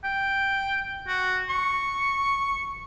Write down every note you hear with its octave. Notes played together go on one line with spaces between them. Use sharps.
G5
F#4
C#6